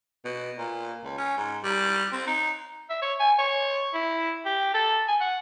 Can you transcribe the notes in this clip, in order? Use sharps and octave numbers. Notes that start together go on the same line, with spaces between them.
B2
A#2
C#2
C#4
G#2
G3
C4
D#4
E5
C#5
G#5
C#5
E4
G4
A4
G#5
F#5